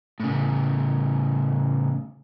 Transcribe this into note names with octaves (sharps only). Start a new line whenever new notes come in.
A2 C#3